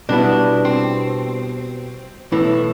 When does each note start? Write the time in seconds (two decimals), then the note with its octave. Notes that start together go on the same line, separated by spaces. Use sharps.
0.09 B2 G3 B3 D4 E4
0.65 C4
2.32 B1 A2 E3 E4